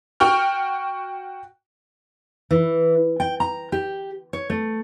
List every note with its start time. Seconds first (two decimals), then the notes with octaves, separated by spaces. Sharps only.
0.20 F#4 G5 C#6 F6
2.51 E3
3.20 G5
3.40 A#5
3.72 G4
4.33 C#5
4.50 A3